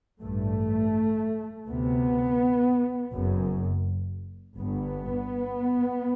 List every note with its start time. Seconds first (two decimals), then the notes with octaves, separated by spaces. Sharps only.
0.22 A1 G2 A3
1.67 D2 C3 B3
3.13 F#1 F#2
4.59 G1 G2 B3